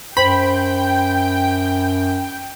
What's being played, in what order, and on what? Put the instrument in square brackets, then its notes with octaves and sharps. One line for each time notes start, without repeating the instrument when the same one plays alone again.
[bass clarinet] F#2 [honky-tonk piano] C5 [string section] G5 [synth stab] B5